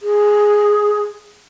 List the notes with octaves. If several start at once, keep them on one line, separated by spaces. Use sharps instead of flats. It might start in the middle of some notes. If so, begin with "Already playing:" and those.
G#4